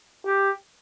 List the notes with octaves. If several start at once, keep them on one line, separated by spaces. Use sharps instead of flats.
G4